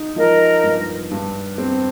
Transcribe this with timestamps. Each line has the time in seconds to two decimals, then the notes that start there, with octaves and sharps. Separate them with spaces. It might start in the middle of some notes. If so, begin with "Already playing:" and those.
Already playing: D#4
0.16 F3 A#4 D#5
0.64 G2
1.11 G2
1.58 C4